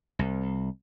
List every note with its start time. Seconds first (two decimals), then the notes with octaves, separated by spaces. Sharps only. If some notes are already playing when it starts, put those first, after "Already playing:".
0.19 C2